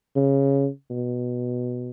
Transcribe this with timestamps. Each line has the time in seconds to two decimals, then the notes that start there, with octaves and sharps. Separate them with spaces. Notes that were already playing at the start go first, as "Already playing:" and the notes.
0.16 C#3
0.90 B2